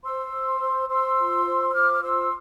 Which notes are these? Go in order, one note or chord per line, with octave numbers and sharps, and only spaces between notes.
C5 C6 E6
C5
C5
C5 C6 E6
F4
C5
E6
F4 D6 F6
F6
C5 C6 E6